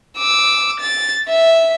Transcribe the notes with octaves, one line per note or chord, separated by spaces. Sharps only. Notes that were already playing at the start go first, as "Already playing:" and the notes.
D6 E6
A6
E5